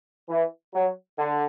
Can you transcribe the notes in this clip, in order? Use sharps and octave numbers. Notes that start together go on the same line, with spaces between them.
E3
F#3
D3